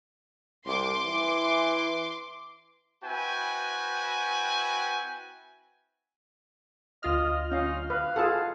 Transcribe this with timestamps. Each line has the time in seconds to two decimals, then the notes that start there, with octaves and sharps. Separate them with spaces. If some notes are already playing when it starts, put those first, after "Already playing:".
0.65 C2 C6 D6
1.04 E3
3.03 C4 E4 F#4 B4 G5 G#5
7.03 D2 F4 D#5 F6
7.51 C#4 D#4 F5
7.90 B4 F5
8.16 F4 G#4 A4 F#5 A5